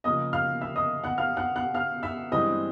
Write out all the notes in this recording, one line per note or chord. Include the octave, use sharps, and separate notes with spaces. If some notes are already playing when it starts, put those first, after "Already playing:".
C#3 F3 A#3 D#5 D#6
F5 F6
E5 E6
D#5 D#6
F#5 F#6
F5 F6
F#5 F#6
F#5 F#6
F5 F6
E5 E6
G2 E3 G#3 C4 D#5 D#6